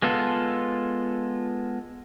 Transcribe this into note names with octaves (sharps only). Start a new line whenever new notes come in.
G#3 B3 F4 A4